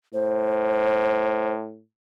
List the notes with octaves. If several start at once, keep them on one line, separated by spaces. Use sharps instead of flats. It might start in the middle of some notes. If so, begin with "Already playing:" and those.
A2 C5